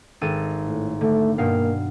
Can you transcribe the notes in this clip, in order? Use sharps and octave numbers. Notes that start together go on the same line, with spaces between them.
G#1 A4 D#7
A2
D3 A3
G2 B2 A#3 F5